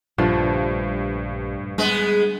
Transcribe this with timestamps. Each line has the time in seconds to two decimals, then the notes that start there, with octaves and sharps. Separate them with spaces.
0.18 A#1 G2 D3 F3 A3
1.78 G3 G#3 B3 D4